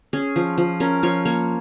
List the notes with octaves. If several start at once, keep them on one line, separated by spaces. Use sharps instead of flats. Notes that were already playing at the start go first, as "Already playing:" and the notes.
C#4 G#4
F3
F3
C#4 A#4
F3 C#5
A#3 C#5